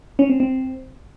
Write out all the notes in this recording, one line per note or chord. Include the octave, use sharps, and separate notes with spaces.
C#4
C4
C4